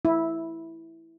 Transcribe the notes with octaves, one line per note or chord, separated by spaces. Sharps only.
E4